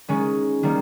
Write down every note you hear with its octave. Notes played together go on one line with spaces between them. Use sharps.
D#3 G#3 C#4
D#3 G3 A#3